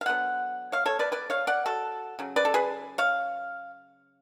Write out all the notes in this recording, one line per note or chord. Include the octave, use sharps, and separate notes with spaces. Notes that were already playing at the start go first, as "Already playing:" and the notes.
F5
D3 F#3 B3 F#5
C#5 F5
A4 C#5
B4 D5
B4 D5
C#5 F5
D5 F#5
F#4 A4
C#3 F#3
B4 D5
A4
G#4 B4
C#5 F5